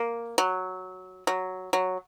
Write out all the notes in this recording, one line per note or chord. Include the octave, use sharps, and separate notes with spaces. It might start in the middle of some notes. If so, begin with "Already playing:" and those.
Already playing: A#3
F#3
F#3
F#3